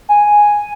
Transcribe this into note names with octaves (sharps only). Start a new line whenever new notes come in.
G#5